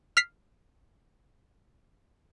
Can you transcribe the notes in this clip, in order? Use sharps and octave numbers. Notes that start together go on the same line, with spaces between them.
F6 B6 C7